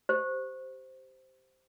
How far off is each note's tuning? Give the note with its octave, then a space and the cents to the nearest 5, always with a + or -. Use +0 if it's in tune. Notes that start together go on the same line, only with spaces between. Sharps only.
G4 -10 C5 -5